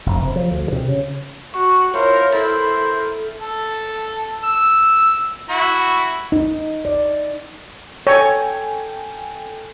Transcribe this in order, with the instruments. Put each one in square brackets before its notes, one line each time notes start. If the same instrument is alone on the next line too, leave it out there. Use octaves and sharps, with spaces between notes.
[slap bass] F1
C3
F3
D2
C3
C#3
[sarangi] F#4 [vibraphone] C#6
[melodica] E4 F4 C5 [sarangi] A#4 [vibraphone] C#5
[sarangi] E4 [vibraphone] A4 [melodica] A#4 C5
[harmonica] A4
E6
E4 F#4 B5
[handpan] D#4
D5
[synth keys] A4 G5 G#5 [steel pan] C#5